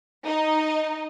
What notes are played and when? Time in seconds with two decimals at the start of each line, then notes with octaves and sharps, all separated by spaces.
0.25 D#4 D#5